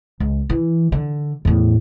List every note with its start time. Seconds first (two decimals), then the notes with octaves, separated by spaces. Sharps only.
0.20 C#2
0.50 E3
0.92 D3
1.45 E2 A2